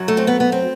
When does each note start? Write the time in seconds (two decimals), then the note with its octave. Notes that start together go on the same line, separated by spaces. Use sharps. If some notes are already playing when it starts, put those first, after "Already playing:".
Already playing: F#2 F#3
0.08 A3
0.17 C4
0.27 B3
0.40 B3
0.52 C4